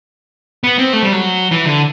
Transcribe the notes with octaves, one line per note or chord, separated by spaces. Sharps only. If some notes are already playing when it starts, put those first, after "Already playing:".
B3
C4
A3
G3
F#3
E3
D3